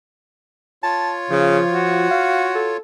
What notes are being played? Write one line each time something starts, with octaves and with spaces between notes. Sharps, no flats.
F4 C#5 A5
C#3 F3
F#4
F5
A4